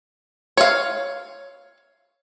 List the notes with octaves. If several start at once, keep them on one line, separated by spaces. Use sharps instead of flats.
C#5 F5